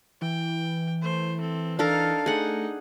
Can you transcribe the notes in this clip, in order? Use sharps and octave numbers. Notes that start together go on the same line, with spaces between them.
E3 G5
A3 C5
C4 A4
D4 D#4 A4 A#4 F5
A3 D#4 G#4 F#5